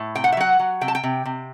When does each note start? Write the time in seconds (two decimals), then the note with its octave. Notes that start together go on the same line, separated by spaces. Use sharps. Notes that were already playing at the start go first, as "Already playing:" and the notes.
Already playing: A2
0.15 C3 G5
0.24 F#5
0.32 E5
0.37 F#3 F#5
0.59 F#3
0.81 C3 G5
0.88 A5
0.95 G5
1.03 C3
1.25 C3